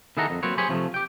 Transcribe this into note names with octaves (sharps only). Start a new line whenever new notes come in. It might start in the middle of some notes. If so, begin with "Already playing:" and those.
D#3 E4 G#4 A4 F#5 A#5
F2
F#3 A#3 C4 B4 C#5
G4 G#4 C5 C#5 G#5 B5
C3 F3 F#3 A3
G4 G5